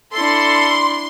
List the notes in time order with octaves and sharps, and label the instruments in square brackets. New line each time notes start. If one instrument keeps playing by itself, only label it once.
[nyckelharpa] D4 E4 [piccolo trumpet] A4 [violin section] C6